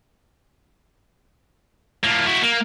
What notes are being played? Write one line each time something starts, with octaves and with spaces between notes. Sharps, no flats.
A2 A#3
E4 F#4
A#3